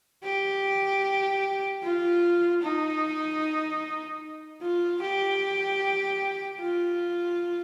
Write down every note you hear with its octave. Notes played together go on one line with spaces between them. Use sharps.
G4
F4
D#4
F4
G4
F4